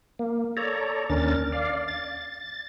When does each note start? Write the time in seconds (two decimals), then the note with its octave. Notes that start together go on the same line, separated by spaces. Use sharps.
0.19 A#3
0.57 A4 C#5 D5 A#5
1.09 D#2 C#4 D4 A#4 A6
1.52 D5 F5
1.88 A6